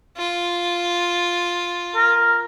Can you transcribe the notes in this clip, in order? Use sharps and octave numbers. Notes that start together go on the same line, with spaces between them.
F4
A#4